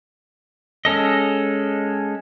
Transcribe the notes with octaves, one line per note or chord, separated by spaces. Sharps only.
G#3 C#4 A4 D#5